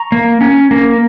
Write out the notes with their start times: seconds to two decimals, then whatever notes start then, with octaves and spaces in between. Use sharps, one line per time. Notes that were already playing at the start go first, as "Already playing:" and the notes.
Already playing: A#5 C#6
0.12 A#3
0.41 C#4
0.71 A#3